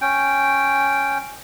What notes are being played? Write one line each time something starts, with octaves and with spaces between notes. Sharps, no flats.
C#4 G5